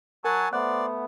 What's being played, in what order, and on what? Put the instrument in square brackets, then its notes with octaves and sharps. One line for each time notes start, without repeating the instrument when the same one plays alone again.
[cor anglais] F#3 [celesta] A#4 [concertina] F#5 G#5 A5
[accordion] A3 B3 [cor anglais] C5 [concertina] D5 [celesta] F#5 F#6